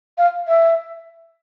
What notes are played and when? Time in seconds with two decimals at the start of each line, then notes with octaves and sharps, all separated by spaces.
0.18 F5
0.48 E5